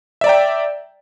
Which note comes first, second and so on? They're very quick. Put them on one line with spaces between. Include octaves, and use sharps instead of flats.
E5 D5 A#5 G5